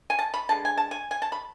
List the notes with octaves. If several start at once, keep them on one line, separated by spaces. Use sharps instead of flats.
G#5
A5
B5
D3 G#3 B3 A5
G#5
A5
G#5
G#5
A5
B5